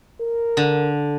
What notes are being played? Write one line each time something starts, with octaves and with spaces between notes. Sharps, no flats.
A#4
D3